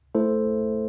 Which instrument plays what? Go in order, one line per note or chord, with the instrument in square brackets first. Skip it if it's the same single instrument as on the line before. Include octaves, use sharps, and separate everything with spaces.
[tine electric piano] A3 E4 A4 C5